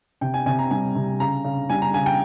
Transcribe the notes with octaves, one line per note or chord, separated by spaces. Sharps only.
C3 G5
G#5
C3 G#5
A#5
G3 G#5
C3
C#3 A#5
C#3
G3 G#5
A#5
C#3 G#5
G5